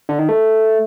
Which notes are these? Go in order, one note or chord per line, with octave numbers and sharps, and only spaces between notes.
D3
D#3
A3